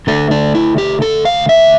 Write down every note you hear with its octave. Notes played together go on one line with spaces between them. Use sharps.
D3 A3 D4 A4
D4
E4
G4
A4
F5
E5